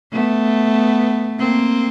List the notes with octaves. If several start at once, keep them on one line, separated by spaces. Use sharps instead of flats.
A3 B3
A#3 C4